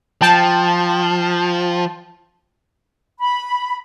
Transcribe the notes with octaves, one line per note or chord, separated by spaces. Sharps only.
F3 G5 A5
B5